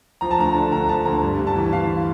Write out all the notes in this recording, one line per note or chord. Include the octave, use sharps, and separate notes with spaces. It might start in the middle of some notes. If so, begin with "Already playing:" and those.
F3 A#5
A5
D2 A#5
D3
D2 A#5
F3 A5
D2 A#5
G2
G2
A5
E3
E3 F5